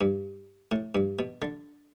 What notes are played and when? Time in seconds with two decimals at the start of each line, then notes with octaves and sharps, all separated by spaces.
0.01 G2
0.72 A2
0.95 G2
1.19 B2
1.42 D3